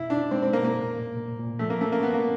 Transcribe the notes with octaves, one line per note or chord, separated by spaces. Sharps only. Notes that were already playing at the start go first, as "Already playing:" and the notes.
Already playing: B2 E4
D4 D#4
G#3 C4
C4
B2 A#3
A#3
A#2
A#2
A#2
A#2
F3 A3
A#3
A3 C#4
A#3
B3 C#4
A#3